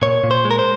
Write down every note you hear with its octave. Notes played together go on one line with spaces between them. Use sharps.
A#2 C#5
A#2
C5
G#3
A#4
C5